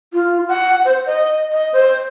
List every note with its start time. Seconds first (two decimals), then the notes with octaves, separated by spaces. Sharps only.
0.14 F4
0.48 F#5
0.85 C5
1.06 D#5
1.52 D#5
1.73 C5